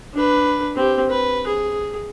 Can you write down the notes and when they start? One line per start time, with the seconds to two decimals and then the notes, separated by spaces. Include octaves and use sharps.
0.14 D4 B4
0.75 C4 G4
1.10 B4
1.47 G#4